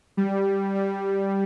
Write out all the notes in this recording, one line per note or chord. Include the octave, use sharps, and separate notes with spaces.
G3
G3